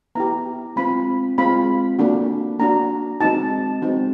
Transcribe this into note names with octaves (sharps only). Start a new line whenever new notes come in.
B3 E4 G4 A#5
G#3 C4 F4 B5
G#3 C4 F4 B5
A#3 D4 F#4
A#3 D4 F#4 A#5
G#3 C4 D#4 F#4 A5
G#3 C4 D#4 F#4